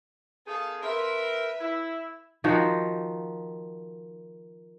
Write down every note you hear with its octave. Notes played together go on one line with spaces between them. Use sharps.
D#3 B3 G#4 A4 F5
C4 A#4 B4 E5
E4
D#3 F3 D#4 F#4